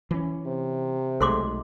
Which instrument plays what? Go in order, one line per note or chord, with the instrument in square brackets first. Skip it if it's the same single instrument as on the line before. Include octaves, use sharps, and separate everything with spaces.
[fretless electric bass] E3 C#4
[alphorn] C3
[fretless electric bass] B1 G#3 A3 [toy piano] A4 C6 D6